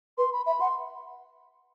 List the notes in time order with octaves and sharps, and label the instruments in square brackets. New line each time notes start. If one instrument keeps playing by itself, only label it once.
[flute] B4 [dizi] C6
[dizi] B5
[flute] E5 [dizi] B5
[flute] F#5 [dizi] C6